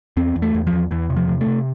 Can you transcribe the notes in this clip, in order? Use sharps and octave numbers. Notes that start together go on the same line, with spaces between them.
E2 C4
E2
A3
E2
F3
E2
E2 E3
C3
F3
C3
A3
C3